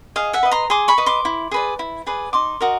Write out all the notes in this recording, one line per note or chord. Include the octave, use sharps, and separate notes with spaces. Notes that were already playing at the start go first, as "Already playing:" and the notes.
G#4 D#5 F5
E5 F#5
B4 D#5
A#5 C6
G#4 C6 D6
B5 C#6
B4 D#5
C6 D6
E4
G#4 B4 D5
E4
G#4 B4 D5
D#4 C6 D6
F#4 A#4 D#5